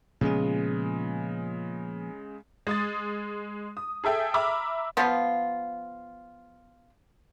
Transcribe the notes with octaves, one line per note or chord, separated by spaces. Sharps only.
A#2 C#3 F3 G#3 B3
G#3 D#6 A6
D#6
G#4 A4 E5 G5
E5 A#5 B5 D6 E6 F6
F3 B3 F4